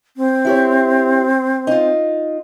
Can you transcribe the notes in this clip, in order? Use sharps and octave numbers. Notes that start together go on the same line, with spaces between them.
C4
E4 G4 C#5
D#4 F4